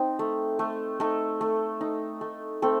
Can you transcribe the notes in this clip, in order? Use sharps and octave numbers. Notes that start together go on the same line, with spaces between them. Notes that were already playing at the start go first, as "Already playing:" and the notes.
Already playing: C4 D#4
A3
A3
A3 D#4 A4
A3
D#4
A3
A3 C4 A4